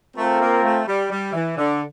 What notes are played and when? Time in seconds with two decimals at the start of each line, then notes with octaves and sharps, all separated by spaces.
0.17 A3 C4 F4 A#4
0.40 A#3
0.63 A3
0.87 G3
1.10 G3
1.33 E3
1.57 D3